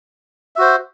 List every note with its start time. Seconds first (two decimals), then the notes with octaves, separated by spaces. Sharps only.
0.56 E5
0.58 F#4
0.61 C5